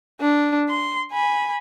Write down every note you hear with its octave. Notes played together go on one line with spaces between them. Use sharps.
D4
C6
G#5 B5